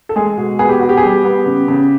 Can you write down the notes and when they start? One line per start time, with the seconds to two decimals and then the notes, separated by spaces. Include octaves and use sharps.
0.09 A4
0.16 G#3 G#4
0.38 B2
0.59 B3 G#4
0.69 G4
0.79 B3 F#4
0.89 G4
0.97 G#4
1.03 G3 G4
1.25 B3
1.46 C#3
1.68 C#3